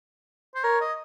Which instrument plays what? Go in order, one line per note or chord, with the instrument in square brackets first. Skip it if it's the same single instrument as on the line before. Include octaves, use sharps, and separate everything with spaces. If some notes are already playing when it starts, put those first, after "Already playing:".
[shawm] C5
[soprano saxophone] A#4 [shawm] C#5
[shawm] D#5